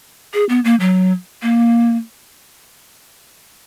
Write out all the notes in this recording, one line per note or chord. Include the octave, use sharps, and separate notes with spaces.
G#4
B3
A#3
F#3
A#3